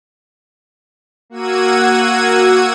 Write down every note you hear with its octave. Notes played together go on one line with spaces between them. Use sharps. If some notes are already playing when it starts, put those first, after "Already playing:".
A#3 F#4 F#5 E6 G#6 D#7